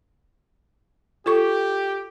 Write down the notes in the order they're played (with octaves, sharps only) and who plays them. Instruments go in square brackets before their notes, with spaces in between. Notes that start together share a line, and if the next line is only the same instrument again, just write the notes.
[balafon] F4 A4 C#6 [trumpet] G4